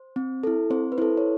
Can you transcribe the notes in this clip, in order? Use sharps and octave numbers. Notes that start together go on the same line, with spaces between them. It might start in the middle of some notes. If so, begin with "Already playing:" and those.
Already playing: C5
C4
E4 A4
C4 C5
B4
E4 A4 C5
C#5